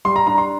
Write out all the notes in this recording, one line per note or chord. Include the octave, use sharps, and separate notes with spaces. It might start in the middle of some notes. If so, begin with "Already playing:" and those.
G3 C6
A#5
D4 A#5
C6